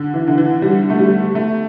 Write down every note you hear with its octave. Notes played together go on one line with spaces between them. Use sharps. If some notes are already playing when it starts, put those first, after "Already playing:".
Already playing: D3
E3
D3
E3
G3
A3
G3
A3